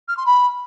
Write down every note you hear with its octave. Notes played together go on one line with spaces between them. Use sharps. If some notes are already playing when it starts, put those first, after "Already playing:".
F6
C6
B5